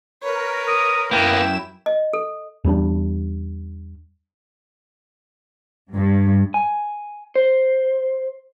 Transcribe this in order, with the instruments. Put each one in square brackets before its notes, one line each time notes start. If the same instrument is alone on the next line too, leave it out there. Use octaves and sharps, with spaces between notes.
[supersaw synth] A#4 [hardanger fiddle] B4 C#5
[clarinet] D#6
[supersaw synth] F#2 E7 [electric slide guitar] A#3 B3 [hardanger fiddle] E4 [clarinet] G5
[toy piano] D#5
A4
[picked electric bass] E2 G3 C4 D4
[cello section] G2
[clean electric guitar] G#5
C5